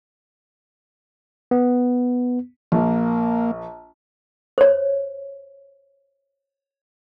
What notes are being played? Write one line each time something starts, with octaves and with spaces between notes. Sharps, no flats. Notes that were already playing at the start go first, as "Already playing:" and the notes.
B3
A#1 A#3
C5 C#5